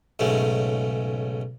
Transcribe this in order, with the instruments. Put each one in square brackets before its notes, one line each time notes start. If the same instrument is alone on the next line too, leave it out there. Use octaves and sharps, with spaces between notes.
[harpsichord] B1 G#2 C#3 A3